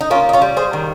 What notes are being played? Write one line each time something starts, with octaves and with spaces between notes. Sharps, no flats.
D#4
A#3 C#4 F4
D#4
C#4 F4
G3
G#4 C5
D#3